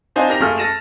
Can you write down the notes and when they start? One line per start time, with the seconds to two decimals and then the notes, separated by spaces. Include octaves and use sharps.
0.16 C4 D4 D#4 C5 F5 G#5
0.28 G4 A#4 A#6 F7
0.40 F#2 A3 F4 G#4 A4 F6
0.58 A4 A6 A#6 D#7 E7